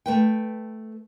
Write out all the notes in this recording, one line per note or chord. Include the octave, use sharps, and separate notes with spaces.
A3 B4 G5